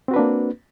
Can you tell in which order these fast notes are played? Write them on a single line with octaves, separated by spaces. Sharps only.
C4 F#4 B4 D4 A#3